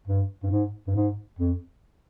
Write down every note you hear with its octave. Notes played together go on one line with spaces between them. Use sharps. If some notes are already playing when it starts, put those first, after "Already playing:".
G2
G2
G#2
G2
G#2
F2